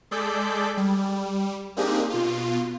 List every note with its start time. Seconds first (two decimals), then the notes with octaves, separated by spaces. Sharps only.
0.11 G#3 G#4 A4 D5 G6 B6
0.77 G3
1.77 A#3 C4 D4 D#4 G4 G#4
2.10 B2 F4